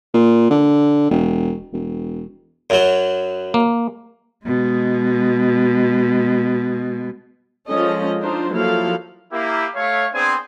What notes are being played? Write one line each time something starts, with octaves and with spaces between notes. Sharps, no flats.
A#2
D3
E1
E1
F#2 F#3
A#3
B2 G#3
F3 G#3 C#4 A4 D#5
D4 D#4 F4 C5
F3 F#3 A#3 E4 A4 F5
A#3 E4 G4
A3 C#5 F5
B3 C4 D4 G#4 C5 G#5